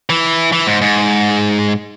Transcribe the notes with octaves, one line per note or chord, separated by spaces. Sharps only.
E3
E3
G#2
G#2